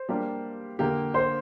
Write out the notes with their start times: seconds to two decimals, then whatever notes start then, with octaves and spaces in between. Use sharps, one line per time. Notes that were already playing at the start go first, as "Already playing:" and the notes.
Already playing: C5
0.09 G3 A#3 D4 G4
0.79 D3 A#3 G4
1.14 C5